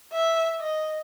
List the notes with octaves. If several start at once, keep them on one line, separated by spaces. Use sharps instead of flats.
E5
D#5